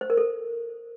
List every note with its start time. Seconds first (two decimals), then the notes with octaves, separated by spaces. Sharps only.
0.01 C5
0.10 A#4
0.17 A4